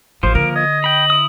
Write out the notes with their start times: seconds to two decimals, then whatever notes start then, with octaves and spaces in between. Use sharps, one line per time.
0.23 A1 F3 A#3 C5
0.35 D3 A#4 D7
0.56 D#5 G#6
0.84 G5 B5 F#7
1.10 E4 D#6